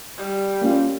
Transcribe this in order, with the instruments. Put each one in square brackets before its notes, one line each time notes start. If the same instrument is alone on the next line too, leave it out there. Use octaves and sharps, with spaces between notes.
[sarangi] G3
[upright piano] A#3 C#4 F4